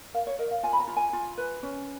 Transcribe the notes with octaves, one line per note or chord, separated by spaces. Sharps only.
A#4 F5
C#5
A#4 D#5
F5
F4 G#5
B5
A#5
F4
G#5
F4
B4
C#4